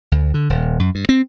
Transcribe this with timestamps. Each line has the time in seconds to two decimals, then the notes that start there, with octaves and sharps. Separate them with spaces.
0.12 D2
0.34 D3
0.50 D#1
0.79 F#2
0.95 G2
1.09 C4